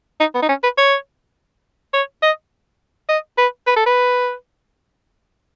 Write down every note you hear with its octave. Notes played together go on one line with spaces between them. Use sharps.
D#4
B3
D#4
C#4
B4
C#5
C#5
D#5
D#5
B4
B4
A4
B4